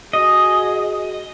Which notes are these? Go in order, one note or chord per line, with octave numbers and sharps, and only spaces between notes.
F#4 G#4 D#5